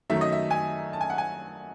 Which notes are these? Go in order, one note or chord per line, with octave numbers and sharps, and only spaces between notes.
F#2 D#3 F#3 A3 E5
D#5
E5
G#5
A5
G#5
F#5
G#5